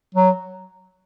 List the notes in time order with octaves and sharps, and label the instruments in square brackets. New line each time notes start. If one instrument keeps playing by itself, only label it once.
[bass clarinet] F#3